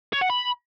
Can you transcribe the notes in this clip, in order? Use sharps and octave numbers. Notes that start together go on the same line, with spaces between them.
C#5
F#5
B5